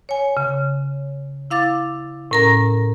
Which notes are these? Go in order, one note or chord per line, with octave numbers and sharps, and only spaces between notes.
C#5 G#5
C#3
E4 F5 D6 A6
A2 C#4 A#4 A#5 A#6